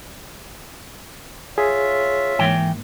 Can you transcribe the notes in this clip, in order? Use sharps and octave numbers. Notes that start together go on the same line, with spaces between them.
F4 G#4 C#5 E5
G#2 E3 A#3 G5